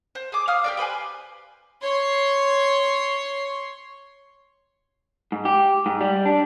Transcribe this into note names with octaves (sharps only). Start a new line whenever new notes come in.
C5
G#4 D6
F5 D#6 F6
G4 A#4 D5
G4 B4 C5 G#5
C#5 C6
G#2
G4
G#2
G3
D4